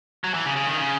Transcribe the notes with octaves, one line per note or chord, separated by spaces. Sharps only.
F#3
E3
C#3
C#3
D#3
C#3